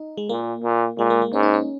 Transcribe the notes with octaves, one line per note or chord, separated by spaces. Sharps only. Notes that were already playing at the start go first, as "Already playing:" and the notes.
Already playing: D#4
G#3
A#2 A#3
A#2
A#2 G#3
A#3
A#3
G#2 C#4
D#4
C#4